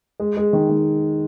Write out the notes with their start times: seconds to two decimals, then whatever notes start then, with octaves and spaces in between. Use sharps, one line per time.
0.20 G#3
0.37 G#3
0.53 D#3
0.69 D#3